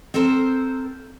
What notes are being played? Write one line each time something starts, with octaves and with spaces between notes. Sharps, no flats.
C4 A4 A#4 C5